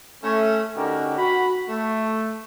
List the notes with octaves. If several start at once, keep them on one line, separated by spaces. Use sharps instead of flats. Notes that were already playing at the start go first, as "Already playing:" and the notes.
A3 C#4
D3 C#4 D#4 F#4 G4 A#4
F#4 B5
A3